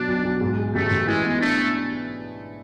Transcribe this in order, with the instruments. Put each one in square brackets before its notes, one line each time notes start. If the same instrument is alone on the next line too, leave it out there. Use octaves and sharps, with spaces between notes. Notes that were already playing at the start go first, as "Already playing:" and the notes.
Already playing: [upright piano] B2 F#3 [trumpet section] D4
[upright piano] B1
B1
G#2
G#3
[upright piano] A1 [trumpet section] A3
[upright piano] A1
[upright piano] E3 [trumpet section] G#3
[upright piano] B3
[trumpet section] A3 [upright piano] D4